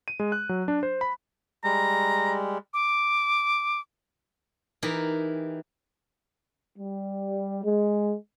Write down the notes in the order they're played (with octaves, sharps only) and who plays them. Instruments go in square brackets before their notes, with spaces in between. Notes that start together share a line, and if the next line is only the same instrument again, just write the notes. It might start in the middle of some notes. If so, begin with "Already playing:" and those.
[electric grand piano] D#7
G#3
F#6
F#3
D4
C5
B5
[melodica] G3 G#3 [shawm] A#5
[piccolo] D6
[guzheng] E3 D#4 G4 G#4 A#4
[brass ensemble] G3
G#3